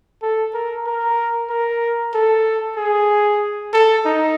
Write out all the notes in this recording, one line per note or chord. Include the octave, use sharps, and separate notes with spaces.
A4
A#4
A#4
A#4
A4
G#4
A4
D#4